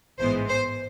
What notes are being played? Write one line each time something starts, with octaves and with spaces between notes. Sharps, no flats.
A1 G#2 E3 G#3 B3 C5
C5